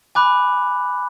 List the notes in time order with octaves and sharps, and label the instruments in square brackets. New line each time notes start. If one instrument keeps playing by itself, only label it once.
[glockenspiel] G#5 B5 D6 F#6